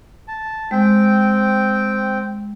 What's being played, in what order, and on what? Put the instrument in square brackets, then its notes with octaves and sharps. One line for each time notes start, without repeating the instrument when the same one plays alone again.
[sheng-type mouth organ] A5
[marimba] G#3 [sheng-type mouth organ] C4 G5